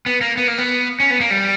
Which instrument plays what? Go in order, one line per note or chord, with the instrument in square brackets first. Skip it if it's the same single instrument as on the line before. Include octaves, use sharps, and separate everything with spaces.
[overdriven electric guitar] B3
A#3
B3
A#3
B3
C#4
B3
A#3
G3